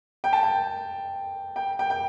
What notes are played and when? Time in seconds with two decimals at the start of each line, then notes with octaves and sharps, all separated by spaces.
0.24 G5
0.33 A5
0.43 G5
1.56 G5
1.79 G5
1.90 G5